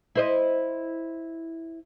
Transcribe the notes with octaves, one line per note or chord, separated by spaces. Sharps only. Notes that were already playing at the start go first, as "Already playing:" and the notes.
E4 C5 D#5